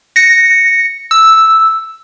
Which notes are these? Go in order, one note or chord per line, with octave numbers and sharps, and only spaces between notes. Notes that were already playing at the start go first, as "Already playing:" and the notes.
A#6 C#7
E6